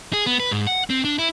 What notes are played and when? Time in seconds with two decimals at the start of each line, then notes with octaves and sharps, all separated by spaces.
0.13 G#4
0.26 B3
0.40 B4
0.51 G#2
0.67 F#5
0.90 C4
1.04 D4
1.18 E4